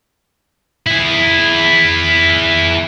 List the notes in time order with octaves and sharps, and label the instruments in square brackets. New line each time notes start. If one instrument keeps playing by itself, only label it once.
[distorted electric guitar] E4 G#4